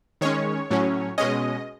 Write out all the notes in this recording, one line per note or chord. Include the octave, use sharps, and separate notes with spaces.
D#3 G#3 C#4 C#5
A2 F#3 C#4
B2 G#3 C#4 D#5